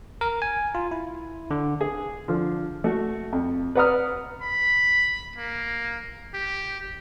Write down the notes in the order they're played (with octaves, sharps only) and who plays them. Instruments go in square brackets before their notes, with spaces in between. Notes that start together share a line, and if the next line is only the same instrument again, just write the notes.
[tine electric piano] A#4
G#5
F4
E4
D3
[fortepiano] G#4
D3 F3
A3 F#4
F2
B4 D5 F#5 A#5 D#6 F6
[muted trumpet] B5
A#3
G4